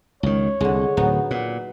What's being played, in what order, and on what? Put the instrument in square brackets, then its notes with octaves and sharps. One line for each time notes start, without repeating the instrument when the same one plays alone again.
[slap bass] C#2 D#3 [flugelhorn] C#5
[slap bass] C2 [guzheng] D3 G#3
[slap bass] D1 [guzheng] F#3 B3 D#4
[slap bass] A#2 [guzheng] F#5